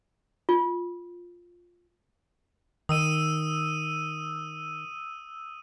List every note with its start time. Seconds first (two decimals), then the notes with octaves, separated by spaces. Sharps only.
0.49 F4
2.89 D#3 D#6 E6 D#7